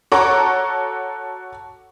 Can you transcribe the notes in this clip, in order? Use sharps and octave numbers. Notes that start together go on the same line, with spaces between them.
F#4 A4 C#5 A#5 C#6 D6